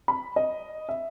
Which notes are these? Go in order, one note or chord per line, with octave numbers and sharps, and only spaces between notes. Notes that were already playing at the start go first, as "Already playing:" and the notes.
B5
D#5
E5